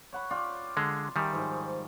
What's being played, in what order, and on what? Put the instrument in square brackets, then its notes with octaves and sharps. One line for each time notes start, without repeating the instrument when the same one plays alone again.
[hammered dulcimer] C#5 F#5 B5
F4 D5 G5
[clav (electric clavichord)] D3 G#3
[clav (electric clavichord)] D#3 G3 [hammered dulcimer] G#4 E5
[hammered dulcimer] G#2 F3